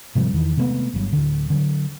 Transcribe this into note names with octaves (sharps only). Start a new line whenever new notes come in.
G#2 C3 F3 G3
E2 D#3 E3
C3 G#3 A3 B3
G1 G2 E3 F#3
D1 D3
D3 F3 F#3